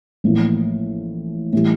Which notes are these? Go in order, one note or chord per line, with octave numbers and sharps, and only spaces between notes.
A1 A2 F3 A#3
A2 E3 G3